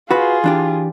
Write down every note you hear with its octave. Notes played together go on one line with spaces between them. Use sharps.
F4 F#4 G#4 B4
E3 D4 G4